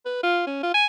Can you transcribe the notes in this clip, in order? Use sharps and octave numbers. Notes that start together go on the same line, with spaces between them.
B4
F4
C#4
F4
G#5